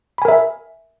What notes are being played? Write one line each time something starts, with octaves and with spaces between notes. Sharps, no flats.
A#4 E5 G#5 B5